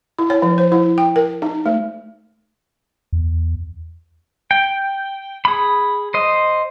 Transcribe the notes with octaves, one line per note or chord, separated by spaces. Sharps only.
E4
C#5
F3
C5
E4
G5
A#4
D#4
A3
E2
G5
G#4 B5
C5 D#5